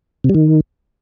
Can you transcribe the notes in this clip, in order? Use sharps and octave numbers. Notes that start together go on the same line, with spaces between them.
C3
G3
D#3